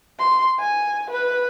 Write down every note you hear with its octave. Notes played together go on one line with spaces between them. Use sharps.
C6
G#5
B4